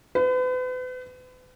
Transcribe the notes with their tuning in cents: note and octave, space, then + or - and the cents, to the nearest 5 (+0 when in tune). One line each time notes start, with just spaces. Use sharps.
B4 +40